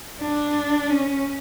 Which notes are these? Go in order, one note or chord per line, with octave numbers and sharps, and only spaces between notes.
D4
C#4